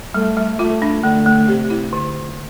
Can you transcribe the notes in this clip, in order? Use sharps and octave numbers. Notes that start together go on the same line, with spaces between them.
G3 A3
G3
A3 F4
D4
D3 A3
A3
C3 G4
E4
D3